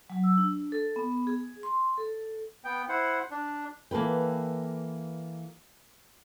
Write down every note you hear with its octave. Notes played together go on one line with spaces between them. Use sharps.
F#3
E6
D4
A4
B3
G#4
C6
A4
B3 G5
E4 C5 F#5
D4
E3 A#3 A4 B4 G5